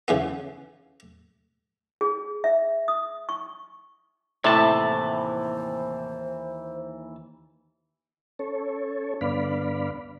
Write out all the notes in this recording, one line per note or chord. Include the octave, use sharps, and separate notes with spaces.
C#3 E3 B3
G#4
E5
D#6
C#6
D#2 A2 C3 E3 A3 E4 C5 A5
C#4 A4 C#5
G2 D3 B3 D5 F5 B5